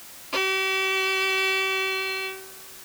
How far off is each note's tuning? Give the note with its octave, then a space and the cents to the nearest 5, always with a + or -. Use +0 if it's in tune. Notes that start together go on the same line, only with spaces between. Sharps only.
G4 -45